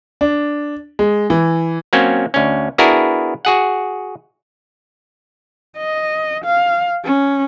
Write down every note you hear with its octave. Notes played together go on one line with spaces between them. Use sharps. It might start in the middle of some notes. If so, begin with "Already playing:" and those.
D4
G#3
E3
F#3 A#3 C4 C#4
D2 C#4
B3 D4 E4 F#4 G#4 A#4
F#4 G#4 F#5
D#5
F5
C#4